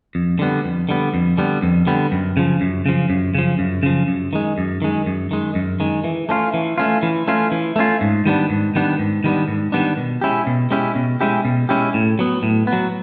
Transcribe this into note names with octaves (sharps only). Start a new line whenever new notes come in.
F2
D3 G3 B3
F2
D3 G3 B3
F2
D3 G3 B3
F2
D3 G3 B3
F#2
C#3 F3
F#2
C#3 F3
F#2
C#3 F3
F#2
C#3 F3
F#2
D#3 G#3
F#2
D#3 G#3
F#2
D#3 G#3
F#2
D#3 G#3
E3
A3 C#4 F4
E3
A3 C#4 F4
E3
A3 C#4 F4
E3
A3 C#4 F4
G#2
D#3 G3 B3 D4
G#2
D#3 G3 B3 D4
G#2
D#3 G3 B3 D4
G#2
D#3 G3 B3 D4
B2
G#3 C#4 E4 G4
B2
G#3 C#4 E4 G4
B2
G#3 C#4 E4 G4
B2
G#3 C#4 E4 G4
A2
F#3 B3
A2
B3
F#3